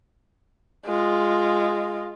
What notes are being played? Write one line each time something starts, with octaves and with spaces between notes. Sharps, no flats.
G#3 F4